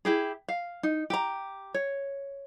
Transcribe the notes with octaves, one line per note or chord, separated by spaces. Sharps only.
E4 G4 G#4
F5
D#4
G4 A#5
C#5